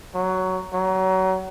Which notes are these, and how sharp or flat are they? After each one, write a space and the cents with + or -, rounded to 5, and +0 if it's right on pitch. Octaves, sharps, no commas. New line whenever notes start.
F#3 +10
F#3 +30